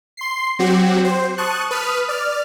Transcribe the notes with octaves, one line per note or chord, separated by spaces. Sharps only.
C6 C7
F#3 C4 F#4 G4
C5
A5 C#6 D#6 F#6
B4 D#6 F6
D5 F6